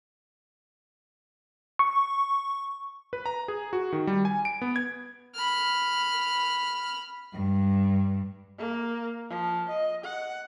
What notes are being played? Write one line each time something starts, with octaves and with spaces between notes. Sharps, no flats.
C#6
B4
A#5
G#4
F#4
D#3
G3
G#5
D7
B3
G#6
B5 F6
G2
A#3
F3
D#5
F#5